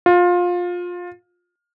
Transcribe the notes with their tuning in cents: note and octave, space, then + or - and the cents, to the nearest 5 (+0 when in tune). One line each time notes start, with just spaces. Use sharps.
F4 +20